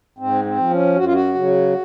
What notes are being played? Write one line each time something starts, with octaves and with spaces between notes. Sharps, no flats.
G#2 C4
C4
F3
C#4
F#2 F#4
F4
F#4
C#3 F#3